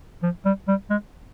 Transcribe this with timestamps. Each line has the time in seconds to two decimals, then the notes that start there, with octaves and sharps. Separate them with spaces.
0.23 F3
0.45 G3
0.68 G3
0.90 G#3